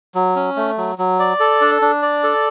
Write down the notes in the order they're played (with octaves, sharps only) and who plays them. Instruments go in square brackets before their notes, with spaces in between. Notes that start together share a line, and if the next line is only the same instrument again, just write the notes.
[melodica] F#3
C#4
A3
F#3
F#3
D5
A4
D4
D4
D5
A4